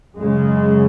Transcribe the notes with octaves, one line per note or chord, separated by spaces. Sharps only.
F#2 C#3 G#3